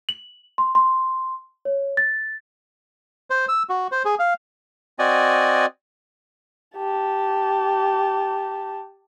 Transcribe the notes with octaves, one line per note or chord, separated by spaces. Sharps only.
F#7
C6
C6
C#5
A6
C5
E6
F#4
C5
G#4
F5
C4 F#4 D5 D#5 G#5
G4 A5